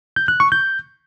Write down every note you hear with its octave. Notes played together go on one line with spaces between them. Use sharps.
G6
F#6
C#6
G6